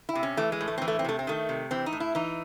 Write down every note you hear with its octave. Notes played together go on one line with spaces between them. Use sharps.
E4
C3
C#4
E3 A3
G#3
A2
A3
E3 C4
A3
C4
C3 A3
C4
D#3 A3
C3
E3 C4
D#4
A2
E4
E3 D#4